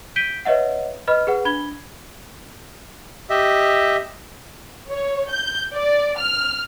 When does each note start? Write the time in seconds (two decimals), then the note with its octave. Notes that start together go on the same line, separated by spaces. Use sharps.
0.16 G6 B6 D7 D#7 G7
0.45 B4 C#5 D#5 E5 F#5
1.07 B4 D#5 B5 F6
1.27 G#4 B4 F#5
1.45 D4 B5 G#6 G7
3.30 G4 D#5 E5
4.89 C#5
5.31 G6
5.75 D5
6.19 F6